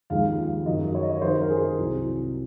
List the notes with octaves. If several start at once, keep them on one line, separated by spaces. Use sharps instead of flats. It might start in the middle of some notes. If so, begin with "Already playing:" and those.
D#2 C#3 F3 G#3 F5
F#2 D#3 F#3 D#5
C#5
D#5
C#5
F#2 D#3 F#3 C5
A#4
G#4
C2 C3 F#3